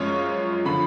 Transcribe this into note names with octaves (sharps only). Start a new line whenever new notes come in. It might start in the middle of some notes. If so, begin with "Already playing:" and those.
Already playing: F#2 F3 G#3 C#4 F4 C#5
D3 F3 B5